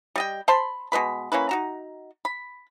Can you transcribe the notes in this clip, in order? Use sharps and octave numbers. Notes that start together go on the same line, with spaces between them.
G3 D#5 G5
C5 A5 B5 C6
B2 G#3 B4 B5
A#3 C#4 E4 B4
D#4 F#4 A#5
B5